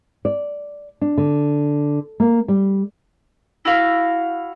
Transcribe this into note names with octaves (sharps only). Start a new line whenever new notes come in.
D5
D4
D3
A#3
G3
E4 F#4 F5